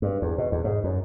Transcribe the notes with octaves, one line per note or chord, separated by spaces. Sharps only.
G2
E2
B2
E2
G#2
F#2